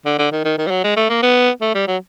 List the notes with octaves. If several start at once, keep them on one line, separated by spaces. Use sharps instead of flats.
D3
D3
D#3
D#3
D#3
G3
F#3
G#3
A3
A#3
B3
A3
G3
F#3